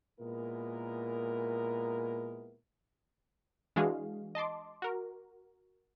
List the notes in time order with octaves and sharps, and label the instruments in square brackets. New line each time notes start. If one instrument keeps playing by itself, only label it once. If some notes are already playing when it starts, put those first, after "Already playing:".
[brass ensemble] A#2 G#3 B3 E4 A#4
[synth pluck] E3 G#3 D4 F#4 G#4 F5
D#5 A5 C6 D6
F#4 A#4